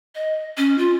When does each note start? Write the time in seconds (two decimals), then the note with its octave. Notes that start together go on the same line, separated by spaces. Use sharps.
0.15 D#5
0.57 C#4
0.78 F4